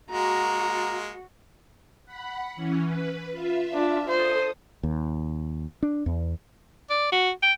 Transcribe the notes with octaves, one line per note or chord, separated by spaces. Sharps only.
G#3 A#3 F#4 A#5
F#5 B5
E3 C#4
B4
F4 E5
D4
A4 C5 D#6
D#2
D4
E2
D5
F#4
G5